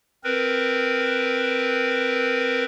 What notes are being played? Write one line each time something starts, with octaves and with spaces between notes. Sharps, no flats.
C4 A#4 B4